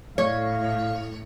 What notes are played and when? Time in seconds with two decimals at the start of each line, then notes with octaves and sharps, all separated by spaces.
0.18 A2 A3 C#5 F5